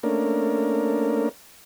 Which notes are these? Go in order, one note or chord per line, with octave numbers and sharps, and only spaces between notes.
A3 A#3 C#4 D4 A#4